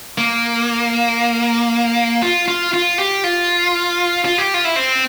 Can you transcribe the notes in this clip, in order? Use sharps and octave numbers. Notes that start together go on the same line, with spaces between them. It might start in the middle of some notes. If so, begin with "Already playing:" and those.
A#3
F4
F4
F4
G4
F4
F4
G4
F4
E4
C4